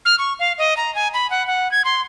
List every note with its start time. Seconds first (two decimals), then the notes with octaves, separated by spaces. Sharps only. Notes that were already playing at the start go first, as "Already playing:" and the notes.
0.05 F6
0.19 C#6
0.39 F5
0.58 D#5
0.77 A#5
0.95 G#5
1.14 B5
1.30 F#5
1.47 F#5
1.71 G#6
1.85 C6